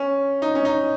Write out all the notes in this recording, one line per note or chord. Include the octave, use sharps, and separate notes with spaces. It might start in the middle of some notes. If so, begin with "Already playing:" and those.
Already playing: C#4
D#4
C#4
D#4